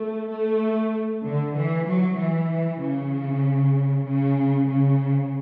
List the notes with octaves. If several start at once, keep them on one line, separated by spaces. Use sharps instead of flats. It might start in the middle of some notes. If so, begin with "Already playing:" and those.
Already playing: A3
A3
D3
E3
F#3
E3
C#3
C#3
C#3